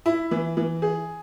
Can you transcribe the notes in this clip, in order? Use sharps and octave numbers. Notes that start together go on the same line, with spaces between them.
E4
E3
E3
G#4